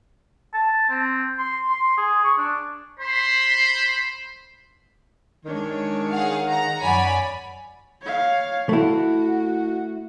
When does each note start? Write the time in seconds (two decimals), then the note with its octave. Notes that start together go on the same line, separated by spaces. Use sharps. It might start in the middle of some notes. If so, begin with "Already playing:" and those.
0.54 A5
0.90 C4
1.38 C6
1.70 C6
1.97 G#4
2.24 C#6
2.38 D4
2.99 C5 B5 C6
5.45 D#3 G#3 D4 C#5
6.13 G#4 F5 F#5
6.50 A#5
6.81 F#2 C#5 D5 G#5 B5
8.02 C#5 F5
8.69 A3 E4 F#4